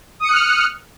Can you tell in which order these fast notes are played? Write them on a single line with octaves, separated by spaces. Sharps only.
D#6 C#7 F#6 F6